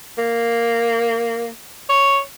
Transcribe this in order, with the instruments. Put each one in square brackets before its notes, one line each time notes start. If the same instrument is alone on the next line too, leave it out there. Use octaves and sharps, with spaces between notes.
[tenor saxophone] A#3
C#5